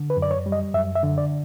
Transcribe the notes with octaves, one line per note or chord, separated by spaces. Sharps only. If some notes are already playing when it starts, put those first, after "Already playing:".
Already playing: D3
B4
F#2
D5
C#5
G3
D#5
F#2 E5
E5
D3
D5